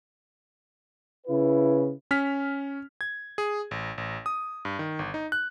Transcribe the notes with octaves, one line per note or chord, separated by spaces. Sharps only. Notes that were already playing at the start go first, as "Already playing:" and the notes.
C#3 E4 B4
C#4 F6 B6
G#6
G#4
A1
A1
D#6
G2
D#3
G1
D#4
F#6